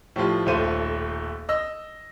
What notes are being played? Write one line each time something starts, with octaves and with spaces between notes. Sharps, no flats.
A2 F3 G3 F4
D#1 B1 A3 F4 C5 D#7
D#5 E6